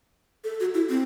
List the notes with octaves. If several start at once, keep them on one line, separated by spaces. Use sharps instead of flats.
A4
F#4
E4
C4